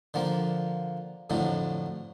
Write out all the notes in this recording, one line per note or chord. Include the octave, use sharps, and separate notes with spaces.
D3 F3 A#3
F2 A2 D3 F#3